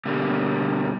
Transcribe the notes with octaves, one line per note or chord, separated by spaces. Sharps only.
B2 D3 G3 A#3